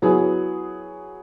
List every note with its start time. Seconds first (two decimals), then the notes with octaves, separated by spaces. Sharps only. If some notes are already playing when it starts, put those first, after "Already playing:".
0.02 F#3 B3 E4 G#4